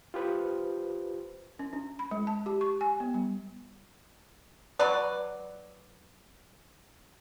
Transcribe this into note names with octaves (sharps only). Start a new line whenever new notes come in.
F4 G4 B4 C5
C#4
D4
B5
G#3
A5
G4
C#6
G#5
B3
G3
F#3 B4 D5